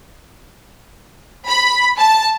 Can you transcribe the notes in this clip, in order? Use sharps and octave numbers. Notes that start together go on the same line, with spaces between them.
B5
A5